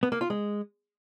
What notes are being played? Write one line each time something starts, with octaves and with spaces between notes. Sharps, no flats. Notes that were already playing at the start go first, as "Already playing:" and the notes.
B3
A#3
F4
G#3